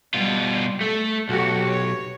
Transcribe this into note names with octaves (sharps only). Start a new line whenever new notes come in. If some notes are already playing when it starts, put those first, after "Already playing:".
B2 G3 F4
A3 A4
B1 F#4 G4 A4
C#5